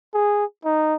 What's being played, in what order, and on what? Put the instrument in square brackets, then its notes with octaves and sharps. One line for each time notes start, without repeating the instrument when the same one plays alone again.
[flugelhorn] G#4
D#4